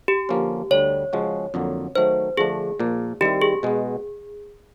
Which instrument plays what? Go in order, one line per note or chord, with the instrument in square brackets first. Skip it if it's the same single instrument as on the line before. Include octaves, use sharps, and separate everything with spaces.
[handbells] G4
[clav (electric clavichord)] D3 F3 A#3 C#4
[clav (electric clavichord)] D2 D3 G3 [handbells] C#5
[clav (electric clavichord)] C#3 F3 G#3 C#4 F#4
F2 D3 F#3 A#3
[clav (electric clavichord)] D#3 F#3 A3 [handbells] C5
[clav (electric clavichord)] D3 F3 A3 D4 [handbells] G#4
[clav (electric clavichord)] A#2 F3 A#3
[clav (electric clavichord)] D#3 G3 C4 E4 [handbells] G4
[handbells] G#4
[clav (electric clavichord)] B2 G#3 B3